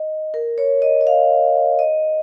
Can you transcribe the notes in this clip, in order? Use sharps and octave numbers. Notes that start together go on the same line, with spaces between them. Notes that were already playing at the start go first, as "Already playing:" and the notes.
Already playing: D#5
A#4
C#5
D#5
D#5
F5
D#5